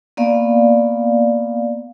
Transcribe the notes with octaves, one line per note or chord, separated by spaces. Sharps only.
A#3 B3 D5 F5